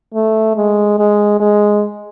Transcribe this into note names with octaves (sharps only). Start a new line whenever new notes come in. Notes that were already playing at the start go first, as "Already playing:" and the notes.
A3
G#3
G#3
G#3